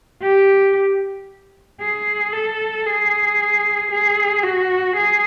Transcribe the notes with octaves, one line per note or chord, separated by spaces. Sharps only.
G4
G#4
A4
G#4
G#4
F#4
G#4